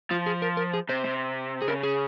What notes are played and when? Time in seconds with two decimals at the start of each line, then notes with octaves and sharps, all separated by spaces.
0.11 F3 F4
0.26 G#4
0.42 A#4
0.57 A#4
0.74 G#4
0.89 C3 C5
1.05 C3
1.62 G#4
1.68 C#3 A#4
1.83 G#4